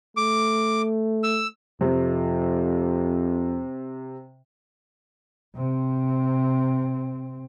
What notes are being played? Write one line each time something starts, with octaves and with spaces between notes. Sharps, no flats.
A3 D6
E6
F2 C3
C3 C4